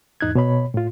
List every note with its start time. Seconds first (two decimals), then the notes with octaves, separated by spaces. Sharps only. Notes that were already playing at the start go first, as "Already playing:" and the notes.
0.21 E2 G#2 D#4 F#6 G#6
0.35 B2 C#5 B5
0.74 A2 F4